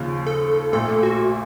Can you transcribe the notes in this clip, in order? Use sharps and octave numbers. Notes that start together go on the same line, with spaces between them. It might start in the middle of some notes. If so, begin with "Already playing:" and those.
Already playing: D#2 C#3 F3
A4
A#1 A#2 A3 A4
F#4